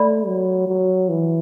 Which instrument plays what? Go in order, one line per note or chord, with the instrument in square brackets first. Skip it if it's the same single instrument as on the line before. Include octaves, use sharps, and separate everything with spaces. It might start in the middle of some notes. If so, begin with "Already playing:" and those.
Already playing: [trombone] A3 [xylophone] D5 B5
[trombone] F#3
F#3
E3